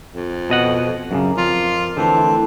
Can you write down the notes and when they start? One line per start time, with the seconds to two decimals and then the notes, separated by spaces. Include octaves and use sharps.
0.13 F2
0.50 B2 D#5 F#5
1.11 F#2 A2 C#3 A#4 D6
1.38 F2 F4
1.97 D3 E3 A3 C4 A4 C5
2.17 E4